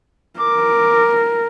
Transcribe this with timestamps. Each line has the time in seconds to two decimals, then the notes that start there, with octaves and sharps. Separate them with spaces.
0.40 A#4 D6